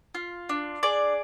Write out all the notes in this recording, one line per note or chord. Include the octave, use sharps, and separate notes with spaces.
F4
D4
G#4 D5